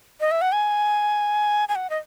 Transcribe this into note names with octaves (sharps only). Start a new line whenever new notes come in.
D#5
E5
F#5
G#5
G#5
F#5
D#5